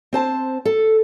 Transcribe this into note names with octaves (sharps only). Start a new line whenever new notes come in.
C4 C5 A5
A4